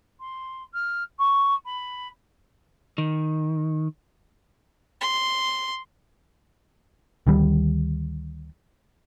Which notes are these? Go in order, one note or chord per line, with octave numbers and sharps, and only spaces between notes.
C6
F6
C#6
B5
D#3
C6
D2 D#3 G3